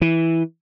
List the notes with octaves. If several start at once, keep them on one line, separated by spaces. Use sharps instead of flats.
E3